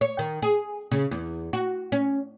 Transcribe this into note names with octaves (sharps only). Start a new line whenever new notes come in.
C#5
D#3
G#4
C#3
E2
F#4
C#4